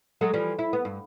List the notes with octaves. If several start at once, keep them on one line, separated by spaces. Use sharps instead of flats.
F#3 G#3 A4
E3 F3 G3
E4
B3
G2